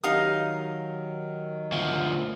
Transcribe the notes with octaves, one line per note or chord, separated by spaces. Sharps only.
D#3 F#3 D#4 G4 F5 D#6
D2 F3